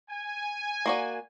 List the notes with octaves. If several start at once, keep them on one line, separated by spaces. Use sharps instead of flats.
G#5
A#3 F#4 D5